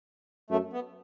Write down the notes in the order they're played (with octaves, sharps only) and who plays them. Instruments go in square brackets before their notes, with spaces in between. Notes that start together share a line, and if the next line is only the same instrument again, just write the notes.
[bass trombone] F#2 [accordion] A3
[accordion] B3